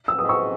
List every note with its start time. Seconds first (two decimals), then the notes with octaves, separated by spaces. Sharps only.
0.08 E6
0.18 G#2 D#6
0.29 C#6 E6